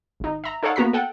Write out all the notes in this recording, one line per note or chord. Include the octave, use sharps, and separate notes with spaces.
G#1 D#4
E5 A#5
D#4 A4 C#5 F5 F#5
A#3 B3 F#4 A#5 B6
A4 F#5 G5